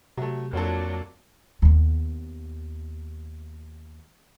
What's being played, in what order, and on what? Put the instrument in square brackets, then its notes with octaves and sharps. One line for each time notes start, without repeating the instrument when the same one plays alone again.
[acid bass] C3 [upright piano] F#3 A3
[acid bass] F2 [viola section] F#3 D4 [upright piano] A#3 F4 A4
[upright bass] D#2 B3